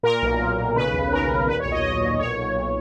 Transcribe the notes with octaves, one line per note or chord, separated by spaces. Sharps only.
A#2 A#4
B1
A#2
B1
C#3 B4
D#2
C#3 A#4
D#2
A#2 B4
C#5
B1
D#5
B1 D#5
A#2
B1 C#5
B1
B1